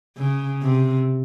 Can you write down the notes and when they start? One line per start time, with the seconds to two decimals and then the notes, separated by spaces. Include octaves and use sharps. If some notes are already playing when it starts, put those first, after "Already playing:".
0.18 C#3
0.62 C3